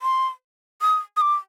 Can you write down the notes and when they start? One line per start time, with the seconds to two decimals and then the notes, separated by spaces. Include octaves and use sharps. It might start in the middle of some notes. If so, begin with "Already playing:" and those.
0.02 C6
0.82 D#6
1.17 D#6
1.21 D6